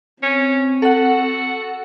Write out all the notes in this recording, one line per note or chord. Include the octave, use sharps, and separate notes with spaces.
C4 C#4
F#4 A4 F#5